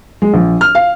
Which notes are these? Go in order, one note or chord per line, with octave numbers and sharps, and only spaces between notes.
G#3
A#1
F6
F5